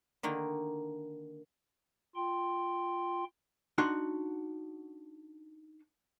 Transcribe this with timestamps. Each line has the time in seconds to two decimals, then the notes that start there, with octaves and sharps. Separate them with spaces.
0.23 D3 D#3 A#3 D#4
2.15 F4 G5 C6
3.78 D4 D#4 F#4 F#5 C6